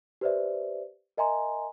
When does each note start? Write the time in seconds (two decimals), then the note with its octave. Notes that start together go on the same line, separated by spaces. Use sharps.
0.21 G4 B4 C5 D5 E5
1.17 A#4 D#5 E5 G#5 A#5 C6